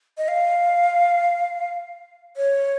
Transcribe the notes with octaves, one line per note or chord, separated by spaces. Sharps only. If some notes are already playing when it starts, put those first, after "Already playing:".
D#5
F5
C#5